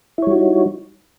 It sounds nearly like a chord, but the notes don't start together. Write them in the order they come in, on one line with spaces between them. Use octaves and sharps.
E4 C#5 G3 F#4 D#4